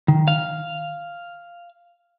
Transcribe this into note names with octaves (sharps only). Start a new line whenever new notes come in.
D#3
F5